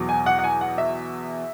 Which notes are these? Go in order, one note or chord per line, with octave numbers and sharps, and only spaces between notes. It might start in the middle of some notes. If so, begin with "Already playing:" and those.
Already playing: E2 B2 F#3
G#5
F#5
F#5
G#5
F#5
E5